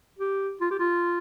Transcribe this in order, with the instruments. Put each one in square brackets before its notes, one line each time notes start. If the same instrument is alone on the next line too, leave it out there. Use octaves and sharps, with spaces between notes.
[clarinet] G4
F4
G4
F4